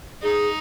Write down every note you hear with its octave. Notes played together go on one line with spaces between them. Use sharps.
D#4 G#4